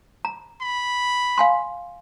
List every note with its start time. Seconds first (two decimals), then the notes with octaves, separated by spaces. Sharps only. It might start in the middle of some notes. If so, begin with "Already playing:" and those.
0.25 A#5
0.61 B5
1.38 F5 G#5 C6